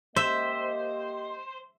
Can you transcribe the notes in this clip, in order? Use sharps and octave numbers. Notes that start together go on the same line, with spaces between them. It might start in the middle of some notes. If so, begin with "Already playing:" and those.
A#3 G4 C5 D#5 E5